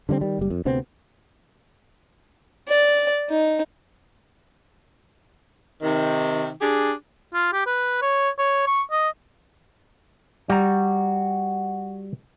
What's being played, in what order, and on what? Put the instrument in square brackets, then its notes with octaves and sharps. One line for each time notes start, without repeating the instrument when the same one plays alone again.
[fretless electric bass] D3 G3 G#3 C4
D#3 G3
F#1 G3
F2
D2 C3 B3 C4
[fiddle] D5
D#4
[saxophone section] C3 D#3
D4 G4 G#4
[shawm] F4
G4
B4
C#5
C#5
C#6
D#5
[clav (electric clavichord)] G3 A#5 [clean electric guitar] F#4